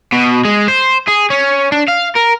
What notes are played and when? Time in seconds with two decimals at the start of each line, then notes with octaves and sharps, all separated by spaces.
0.13 B2
0.45 G#3
0.68 C5
1.08 G#4
1.30 C#4
1.72 D4
1.88 F5
2.15 A#4